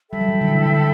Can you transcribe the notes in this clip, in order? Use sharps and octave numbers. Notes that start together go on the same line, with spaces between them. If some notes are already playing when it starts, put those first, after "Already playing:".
G3 A4 E5 G5 B5
F#3
E3
D3
E3
D3